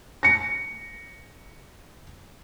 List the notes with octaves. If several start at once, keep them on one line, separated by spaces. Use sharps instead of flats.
A#6 C#7